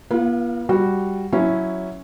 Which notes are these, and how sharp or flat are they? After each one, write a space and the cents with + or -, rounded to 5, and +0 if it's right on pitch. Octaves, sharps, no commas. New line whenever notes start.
B3 -45 F4 -40 F5 -10
G3 +0 F#4 +0
F#3 +0 C#4 +0 E4 +0